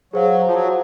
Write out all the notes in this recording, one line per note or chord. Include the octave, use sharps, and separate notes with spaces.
F#3 G#4 C5 F5
F3
F#3